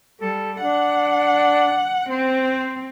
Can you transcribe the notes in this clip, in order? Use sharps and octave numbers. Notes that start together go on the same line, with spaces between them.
G3 A4
D4 F#5
C4 C5